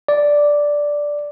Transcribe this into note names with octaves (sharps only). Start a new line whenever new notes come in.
D5